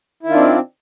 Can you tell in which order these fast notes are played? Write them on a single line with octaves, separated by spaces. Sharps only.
E4 D#3 F4 D4 C4